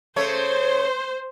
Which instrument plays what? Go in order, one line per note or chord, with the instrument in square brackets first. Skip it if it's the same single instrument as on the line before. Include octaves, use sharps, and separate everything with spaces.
[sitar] C#3 A3 C#5 [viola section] C5